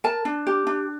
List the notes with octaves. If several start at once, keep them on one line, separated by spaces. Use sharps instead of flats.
A#4 A5
D4
G4
D4